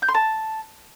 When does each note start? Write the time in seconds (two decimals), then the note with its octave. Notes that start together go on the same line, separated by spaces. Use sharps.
0.02 G6
0.08 C6
0.15 A5